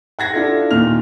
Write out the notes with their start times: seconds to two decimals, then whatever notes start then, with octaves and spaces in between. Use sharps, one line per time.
0.19 F#5 G#6 A#6
0.34 D4 E4 F4 A4
0.71 D#2 A#2 D#3 F6 F7